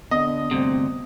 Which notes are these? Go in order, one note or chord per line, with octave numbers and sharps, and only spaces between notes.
D3 B3 D#5
D2 G2 C3 C4